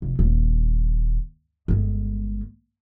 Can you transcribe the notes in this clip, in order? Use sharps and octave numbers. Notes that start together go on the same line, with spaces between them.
F1
D#1
G1 G#3